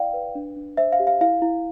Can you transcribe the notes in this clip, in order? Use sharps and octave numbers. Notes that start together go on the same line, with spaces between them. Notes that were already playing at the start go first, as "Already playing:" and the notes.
Already playing: E4 D5 F5 G5
B4
D4
D4
C5 E5
F5
G4
F5
E4 F5
E4